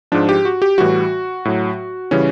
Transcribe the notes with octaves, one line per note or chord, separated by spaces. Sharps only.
G#2 F3 D4
G4
F#4
G4
A2 E3 G3 F#4
A2 F#3
C#3 E3 G3 C#4